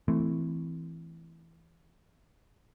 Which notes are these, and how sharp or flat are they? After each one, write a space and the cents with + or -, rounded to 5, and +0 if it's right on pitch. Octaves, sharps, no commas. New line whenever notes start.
E3 +0 A3 +0 C4 -20